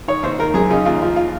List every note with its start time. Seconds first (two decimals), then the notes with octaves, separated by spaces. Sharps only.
0.08 D#3 C#5
0.23 D#2 C5
0.39 D#3 A#4
0.54 F#2 G#4
0.70 C#3 D#4
0.85 D#2 F4
1.01 F3 F4
1.16 F4